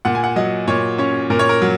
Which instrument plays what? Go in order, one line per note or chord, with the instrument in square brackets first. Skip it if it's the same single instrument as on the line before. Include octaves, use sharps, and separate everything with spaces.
[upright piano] A#2 F#5
G#5
F#5
F#3 D#5
A#2 C#5
C#4 C#5
A#2 A#4
C#5
A#4
F#3